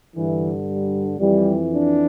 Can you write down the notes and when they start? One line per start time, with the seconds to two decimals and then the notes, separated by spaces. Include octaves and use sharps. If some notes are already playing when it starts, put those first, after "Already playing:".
0.16 G2 D3 E3
0.68 G3
1.20 F2 E3 G3
1.73 D4